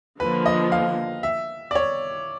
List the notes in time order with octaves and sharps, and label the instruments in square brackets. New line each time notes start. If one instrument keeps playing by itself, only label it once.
[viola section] D3 F3 A#3 [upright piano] B4
[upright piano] D#5
F5
E5
D5
C#5